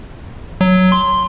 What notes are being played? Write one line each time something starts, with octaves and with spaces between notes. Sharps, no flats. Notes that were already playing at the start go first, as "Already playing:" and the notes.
F#3
C6